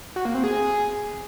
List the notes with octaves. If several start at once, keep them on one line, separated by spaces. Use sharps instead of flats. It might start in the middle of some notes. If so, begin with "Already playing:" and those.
F#4
A#3
C4
G#4